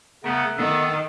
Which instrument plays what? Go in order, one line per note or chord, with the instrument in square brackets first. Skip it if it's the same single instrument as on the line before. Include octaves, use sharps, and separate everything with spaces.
[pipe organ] C#3 A3 B3 [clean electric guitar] A#4 E5 F#5
[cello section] D#3 [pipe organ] B3 [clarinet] A4